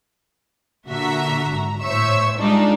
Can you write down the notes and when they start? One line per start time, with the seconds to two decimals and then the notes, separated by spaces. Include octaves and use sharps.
0.87 A#2 D3 F#4 E5 A#5
1.49 G#1 A#5
1.81 A2 C5 C#5 E5 C#6 E6
2.38 G3 G#3 D4 D#4 F4